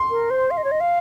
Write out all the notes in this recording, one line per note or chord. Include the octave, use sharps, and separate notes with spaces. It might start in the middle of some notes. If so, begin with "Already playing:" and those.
Already playing: C6
A#4
C5
F5
D#5
C#5
D#5
F5